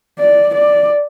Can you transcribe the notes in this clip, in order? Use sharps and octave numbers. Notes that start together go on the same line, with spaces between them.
D5
D5